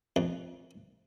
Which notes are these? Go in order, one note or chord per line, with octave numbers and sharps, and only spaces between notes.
F2